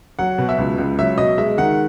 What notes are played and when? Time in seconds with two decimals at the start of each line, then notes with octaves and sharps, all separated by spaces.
0.19 F#3 F#5
0.38 B2
0.49 E5
0.58 C#2
0.78 C#2
0.99 F#3 E5
1.18 B2 D#5
1.38 G#3 E5
1.58 D#3 F#5